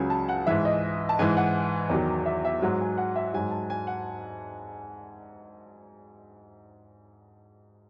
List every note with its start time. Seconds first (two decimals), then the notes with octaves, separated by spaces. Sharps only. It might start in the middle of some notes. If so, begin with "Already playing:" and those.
Already playing: C#2 C#3 F#3 G#5
0.10 A5
0.29 F#5
0.47 G#2 E3 E5
0.65 D#5
1.09 A5
1.19 G#2 E3 G#5
1.37 F#5
1.90 E2 D#3 F#3
2.26 E5
2.45 E5
2.62 G#2 F#3 F#5
2.81 G#5
2.98 F#5
3.16 E5
3.34 G#2 F#3 G#5
3.51 A5
3.70 G#5
3.87 F#5